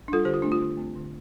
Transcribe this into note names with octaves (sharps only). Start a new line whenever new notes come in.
G3 D4 F4 A4
D3 G4 C5
F4
A3 C4 D4
F4
D3
A3 C4
D3